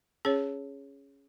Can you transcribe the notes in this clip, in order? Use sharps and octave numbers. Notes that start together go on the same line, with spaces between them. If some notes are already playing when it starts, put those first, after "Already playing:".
C#4 G#4 C#5